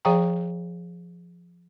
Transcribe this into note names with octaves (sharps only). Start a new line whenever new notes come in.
F3 G#4 D5 F5 G5 A#5